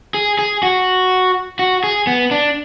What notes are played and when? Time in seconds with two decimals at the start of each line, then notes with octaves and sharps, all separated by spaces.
0.14 G#4
0.39 G#4
0.63 F#4
1.59 F#4
1.84 G#4
2.07 B3
2.31 D4